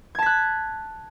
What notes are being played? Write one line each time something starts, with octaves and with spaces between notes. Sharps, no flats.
A5 F#6 G#6 B6